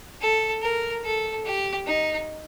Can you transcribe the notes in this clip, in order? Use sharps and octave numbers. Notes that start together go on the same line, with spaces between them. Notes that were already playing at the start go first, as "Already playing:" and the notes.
A4
A#4
A4
G4
D#4